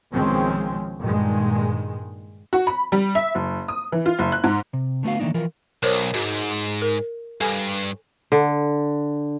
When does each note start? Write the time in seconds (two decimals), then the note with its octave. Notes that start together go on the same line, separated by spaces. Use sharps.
0.12 B1 D#3 F3 G#3 C4 C#4
0.99 G2 A#2 D#3 G#3
2.53 F#4
2.67 B5
2.92 G3
3.15 E5
3.35 F#1
3.68 D#6
3.92 E3
4.06 F4
4.19 F#1
4.32 F#6
4.44 G#2
4.73 C3
5.03 D3 A3 B3 F#4 F5
5.19 D#3 E3 A3 A#3 D4 D#4
5.34 E3 F3 F4 A#4
5.83 B1 A#4 C5 C#5
6.14 G#2 F#4
6.82 A#4
7.41 G2 A4 G#5
8.32 D3